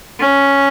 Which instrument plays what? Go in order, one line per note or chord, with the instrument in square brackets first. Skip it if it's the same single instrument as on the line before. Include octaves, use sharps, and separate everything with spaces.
[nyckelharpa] C#4